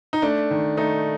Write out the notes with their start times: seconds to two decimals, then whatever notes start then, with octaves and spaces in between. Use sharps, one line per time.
0.13 D#4
0.22 A3 D4
0.51 D#3
0.77 A3 D#4